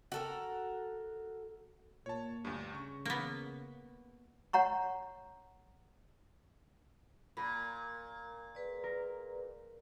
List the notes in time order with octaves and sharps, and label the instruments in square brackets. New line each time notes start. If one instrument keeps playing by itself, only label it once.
[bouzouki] F#4 A4 A#4
[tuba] A#2 [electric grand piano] C#5 A5
[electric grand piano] D2 G2
[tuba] C#3 [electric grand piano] C#6
[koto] A#3 B3
[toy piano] C#5 F#5 A#5 C#6
[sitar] A#2 [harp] A#4 B5
[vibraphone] G#4 B4 D5
[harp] A#4